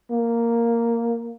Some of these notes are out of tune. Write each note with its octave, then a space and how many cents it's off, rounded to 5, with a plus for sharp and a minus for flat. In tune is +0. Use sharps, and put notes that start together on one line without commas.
A#3 -5